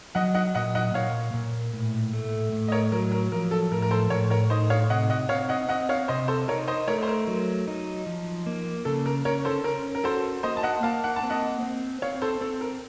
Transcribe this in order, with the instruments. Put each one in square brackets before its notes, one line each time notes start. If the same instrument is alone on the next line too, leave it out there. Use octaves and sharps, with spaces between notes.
[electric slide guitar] F#3 [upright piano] D#5 F#5
[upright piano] D#5 F#5
[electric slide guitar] A#2 [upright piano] D#5 F#5
[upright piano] D#5 F#5
[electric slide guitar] A#2 [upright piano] C#5 F5
[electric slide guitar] A#2
A2
A3
A2
[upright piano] D#5
A#4 C#5
[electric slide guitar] F#3 [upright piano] A#4
[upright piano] A#4
[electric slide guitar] F3 [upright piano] A#4
[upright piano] A4
[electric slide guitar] A2 [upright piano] A#4
[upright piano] A#4
A4 C5
[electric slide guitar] A2 [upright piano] A#4 C#5
[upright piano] A#4 C#5
[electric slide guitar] D#4 [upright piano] C5 D#5
[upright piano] C#5 F5
[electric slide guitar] C3 [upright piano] D#5 F#5
[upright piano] D#5 F#5
[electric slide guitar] C4 [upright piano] C#5 F5
[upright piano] D#5 F#5
[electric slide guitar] C4 [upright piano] D#5 F#5
[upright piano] C#5 F5
[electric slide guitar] C3 [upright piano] C5 D#5
[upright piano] A4 C5
[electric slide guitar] D#4 [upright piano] A#4 C#5
[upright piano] C5 D#5
[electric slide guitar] A3 [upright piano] A#4 C#5
[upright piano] C5
A#4
[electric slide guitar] F#3
D#4
F3
A#3
[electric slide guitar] C#3 [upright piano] A4
[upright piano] A#4
[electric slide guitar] C#4 [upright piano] A#4 C#5
[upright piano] A4 C5
[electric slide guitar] C#4 [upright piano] A#4
[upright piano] A#4
[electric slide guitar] F#4 [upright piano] A4 C5
[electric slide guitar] A#3 [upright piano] C5 D#5
[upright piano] A5
D#5 F#5
[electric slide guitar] A#3 [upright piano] F5 A5
[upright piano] F#5
A5
[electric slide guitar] C4
[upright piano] D#5 F#5
[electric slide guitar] C4
[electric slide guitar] C4 [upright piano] C#5 F5
[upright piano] A4 C5
[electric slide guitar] C4 [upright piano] A4
[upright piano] A#4